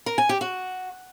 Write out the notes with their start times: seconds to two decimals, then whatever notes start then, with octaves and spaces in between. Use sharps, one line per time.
0.06 A#4
0.18 G#5
0.29 G4
0.41 F#4